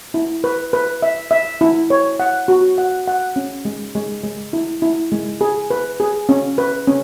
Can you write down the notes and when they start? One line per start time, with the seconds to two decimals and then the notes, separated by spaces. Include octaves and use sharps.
0.14 E4
0.44 B4
0.73 B4
1.02 E5
1.31 E5
1.61 E4
1.90 C#5
2.20 F#5
2.48 F#4
2.78 F#5
3.07 F#5
3.36 C#4
3.65 G#3
3.95 G#3
4.24 G#3
4.53 E4
4.82 E4
5.12 G#3
5.41 G#4
5.70 B4
6.00 G#4
6.29 C#4
6.58 B4
6.87 C#4